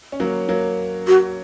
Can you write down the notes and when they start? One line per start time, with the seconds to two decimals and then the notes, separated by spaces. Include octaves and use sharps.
0.12 C#4
0.20 F#3 A#3
0.49 F#3 A#3
1.07 F#4